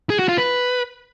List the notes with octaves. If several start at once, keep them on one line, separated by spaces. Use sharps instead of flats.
G#4
F#4
F4
B4